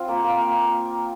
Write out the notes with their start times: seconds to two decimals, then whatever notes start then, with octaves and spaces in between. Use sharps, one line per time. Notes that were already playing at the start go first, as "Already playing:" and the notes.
Already playing: C4 F4
0.08 A#3
0.24 A#3
0.41 A#3